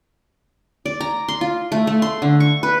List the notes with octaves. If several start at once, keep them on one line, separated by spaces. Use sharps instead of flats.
D5
A#5
C6
F4
A3
A3
C6
D3
C#6
B4